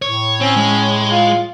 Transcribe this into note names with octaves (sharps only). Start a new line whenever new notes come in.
A2 C#5
C4 C#4
G#3
F4